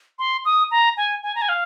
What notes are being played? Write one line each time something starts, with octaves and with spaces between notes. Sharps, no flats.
C6
D#6
A#5
G#5
G#5
A#5
G#5
F5